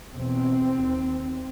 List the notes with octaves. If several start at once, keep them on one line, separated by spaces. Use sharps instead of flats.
E2 B2 C4
D#2